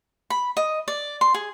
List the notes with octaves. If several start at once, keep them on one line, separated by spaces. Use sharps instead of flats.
B5
D#5
D5
C6
G#4